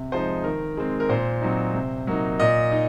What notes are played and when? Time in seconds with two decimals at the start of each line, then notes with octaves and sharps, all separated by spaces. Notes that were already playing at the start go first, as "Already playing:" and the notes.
Already playing: C3
0.12 F3 G#3 D#4 C5
0.44 D#3 A#4
0.77 G#3 C4
1.00 A#4
1.09 A#2 C5
1.41 F#3 C4 D#4
1.74 C3
2.07 F#3 A#3 D#4
2.39 A#2 D#5
2.71 D#4